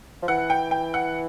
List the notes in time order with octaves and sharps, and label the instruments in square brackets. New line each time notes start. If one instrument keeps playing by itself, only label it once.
[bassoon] F3
[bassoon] E3 [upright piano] F#5
[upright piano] G5
G5
F#5